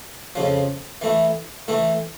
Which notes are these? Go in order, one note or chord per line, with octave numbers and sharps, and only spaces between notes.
F2 C#3 F3
E3 A3 E4
E3 A3 E4